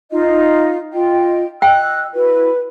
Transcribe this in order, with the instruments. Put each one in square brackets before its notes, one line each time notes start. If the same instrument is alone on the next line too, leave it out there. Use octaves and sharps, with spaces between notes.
[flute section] D#4 F4 D#5
[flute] F4 [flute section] D#5 G5
[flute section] D#5 E6 [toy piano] G5 [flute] F#6
[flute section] E4 F#4 [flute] B4